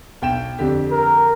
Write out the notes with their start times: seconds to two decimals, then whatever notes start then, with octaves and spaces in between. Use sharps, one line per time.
0.22 B1 G5 E7
0.59 F2 D3 G4
0.91 A#4